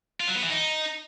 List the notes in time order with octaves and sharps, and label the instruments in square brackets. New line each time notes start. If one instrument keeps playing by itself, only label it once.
[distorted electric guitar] F4
F#3
B3
E3
D#4